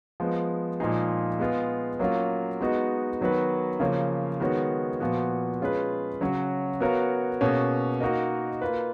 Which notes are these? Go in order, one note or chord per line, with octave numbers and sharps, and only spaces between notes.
F3 G#3 B3
A#2 F3 G#3 D#4 G#4
G#3 B3 F4 G#4
F#3 A#3 C#4 F4
G#3 B3 D#4 F#4
D#3 F#3 B3 F#4 B4
C#3 F3 A#3 C#4
D#3 G#3 B3 F#4 C#5
A#2 F3 B3 F#4
G#3 C#4 F4 G#4 B4
C#3 F#3 C#4 F#4
B3 F#4 A#4 C#5 F5
B2 A#3 C#4 G#4
A#3 D#4 F#4 A#4 D#5
A#3 F4 B4